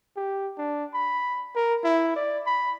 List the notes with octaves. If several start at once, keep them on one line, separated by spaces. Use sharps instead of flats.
G4
D4
B5
A#4
E4
D5
B5